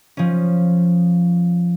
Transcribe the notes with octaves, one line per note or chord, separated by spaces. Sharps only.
F3 C#4